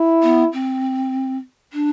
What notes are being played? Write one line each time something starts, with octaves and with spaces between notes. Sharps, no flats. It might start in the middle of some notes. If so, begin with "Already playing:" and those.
Already playing: E4
B3
C4
D4